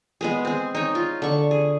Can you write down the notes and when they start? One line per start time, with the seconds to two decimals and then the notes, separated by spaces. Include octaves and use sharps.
0.21 G#3 B3 G#4
0.45 C4 G#4
0.75 D#4 C#5
0.95 F4
1.22 D3 C#6
1.51 G#4